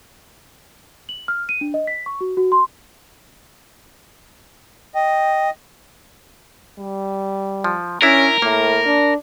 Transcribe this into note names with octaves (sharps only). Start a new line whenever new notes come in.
F#7
F6
D#7
D4
D#5
B6
C#6
F#4
F#4
C6
D#5 G5
G3
F3
C#4 D4 E4 A#4
A2 A#3
D4